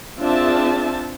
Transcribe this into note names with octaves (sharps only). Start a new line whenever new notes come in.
C4 D4 F4 G#4 E5 A5